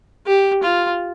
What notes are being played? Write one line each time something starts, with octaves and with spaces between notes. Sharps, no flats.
G4
F4